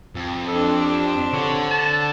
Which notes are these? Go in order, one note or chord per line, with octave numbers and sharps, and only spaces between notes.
F2
C4 D4 A4
G4
D3 C#5
A5